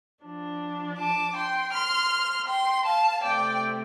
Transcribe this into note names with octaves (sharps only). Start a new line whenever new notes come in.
F3 D4
A5 D6
G5 C6
C6 F6
G5 C6
F5 A5
C3 A3 C4 D5 G5